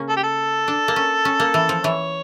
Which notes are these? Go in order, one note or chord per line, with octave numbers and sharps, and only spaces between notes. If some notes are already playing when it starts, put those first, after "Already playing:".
Already playing: C#3 A#3 C#4
A4
G4
A4
D4
A#3
C#4
C#4
A#3
E3
F3
E3 C#5